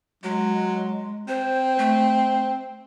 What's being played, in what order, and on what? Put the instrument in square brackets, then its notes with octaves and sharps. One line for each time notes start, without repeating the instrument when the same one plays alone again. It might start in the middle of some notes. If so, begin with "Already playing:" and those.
[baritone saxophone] F#3 [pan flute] G#3
[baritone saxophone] C4 [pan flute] C5
[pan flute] A3